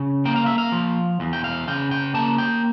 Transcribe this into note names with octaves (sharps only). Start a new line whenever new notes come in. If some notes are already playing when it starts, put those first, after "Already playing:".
Already playing: C#3
A#3 G5
F5
E5
F5
F3
E2
G5
F5
C#3 G5
G5
A#3 A5
G5